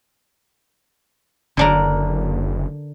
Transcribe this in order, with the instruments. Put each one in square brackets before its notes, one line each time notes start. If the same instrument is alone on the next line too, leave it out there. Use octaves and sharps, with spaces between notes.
[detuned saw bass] F#1 [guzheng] D3 D4 A#4